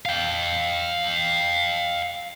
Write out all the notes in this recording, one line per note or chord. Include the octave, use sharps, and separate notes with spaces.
F5 G5